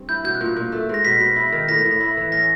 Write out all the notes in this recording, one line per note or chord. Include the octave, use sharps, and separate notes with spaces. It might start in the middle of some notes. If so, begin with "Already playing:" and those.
Already playing: G2 C4
E4 G6
B2 G6
F#6
A#2
G6
A#2
A3
G#2 A#6
B2 B6
B2
E4
D#3
A2 A#6
A2
E4
E3
C#4 A#6